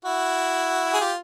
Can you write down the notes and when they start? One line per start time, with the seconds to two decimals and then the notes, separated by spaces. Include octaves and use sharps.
0.05 E4 F#4
0.94 G#4
1.00 F4 G4